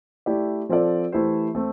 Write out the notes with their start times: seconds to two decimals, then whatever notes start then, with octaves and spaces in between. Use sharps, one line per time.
0.26 A3 E4 G4 D5
0.69 F3 C4 F4 A4 D5
1.12 E3 A3 E4 G4 C5
1.55 A3 C4